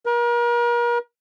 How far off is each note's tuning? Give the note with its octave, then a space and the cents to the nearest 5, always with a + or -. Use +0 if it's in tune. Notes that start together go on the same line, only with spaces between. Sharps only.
A#4 +40